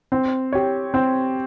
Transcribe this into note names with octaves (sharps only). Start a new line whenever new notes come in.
C4
G4 C#5
C4